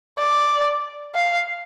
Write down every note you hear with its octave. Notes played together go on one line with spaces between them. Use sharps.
D5
F5